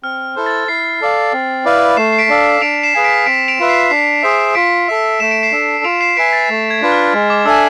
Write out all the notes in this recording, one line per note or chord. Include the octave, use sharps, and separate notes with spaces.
C4 F6
E4 A4 C5
A6
E4 C7
A4 D5 F5
C4
E4 B4 D5 F5
A3 C7 E7
C7
B6 D7
D4 A4 D5 F5
D4 D7 F7
C7 E7
G#4 B4 F5 G#5
B6 D7
C4 B6 D7
D7 F7
F4 B4 E5
C7 E7
D4 C7
G#4 C5 E5
F4 B6 D7
A4 E5
A3 E7
D7
C7 E7
D4 A4
F4 D7 F7
C7 E7
B4 E5 G#5 B6 D7
A6
A3
G#6
D4 F4 B4
F6
G#3
D6
D4 A4 E5 G#5 E6